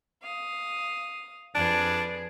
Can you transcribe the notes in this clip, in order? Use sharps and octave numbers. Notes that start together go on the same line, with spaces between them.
F5 D#6
F2 D4 G#4 B4